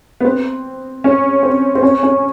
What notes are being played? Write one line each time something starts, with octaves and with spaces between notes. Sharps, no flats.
B3
C4
C#4
C4
C4
C#4
C#4